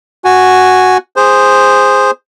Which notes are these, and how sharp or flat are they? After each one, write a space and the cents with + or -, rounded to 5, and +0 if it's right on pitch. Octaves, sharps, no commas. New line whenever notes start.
F#4 +0 G#5 +0
G#4 -15 C5 +0